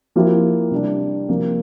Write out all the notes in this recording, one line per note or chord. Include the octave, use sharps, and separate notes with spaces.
F3 A#3 E4 G4
C3 G3 D4
C3 F3 A#3